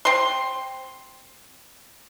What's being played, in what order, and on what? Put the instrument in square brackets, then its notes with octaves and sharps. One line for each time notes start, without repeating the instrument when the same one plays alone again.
[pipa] C4 C6